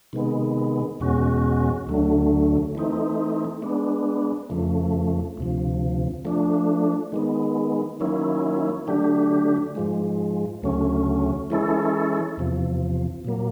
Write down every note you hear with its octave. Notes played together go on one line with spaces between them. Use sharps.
C3 D#3 G#3 B3
E2 B2 G#3 C#4 F#4
D2 D3 F#3 A3
E3 A3 C4 D#4
G#3 B3 D4
F2 C#3 F3 A3
D2 C3 F3
F3 A3 D4
D#3 G#3 B3
D#3 F#3 A#3 C#4 E4
D3 F#3 A3 D4 G4
G#2 F3 G#3
D2 C#3 F#3 A3 C#4
E3 G#3 C#4 E4 A4
E2 C3 F3
A#2 F#3 A#3